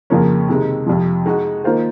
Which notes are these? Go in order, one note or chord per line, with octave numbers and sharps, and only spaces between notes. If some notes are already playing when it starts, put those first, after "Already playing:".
F2 C#3 F3 A#3 C#4
C3 D#3 G#3 D#4
F2 C3 F3
G#3 D#4 F#4
D#3 A#3 F4 C5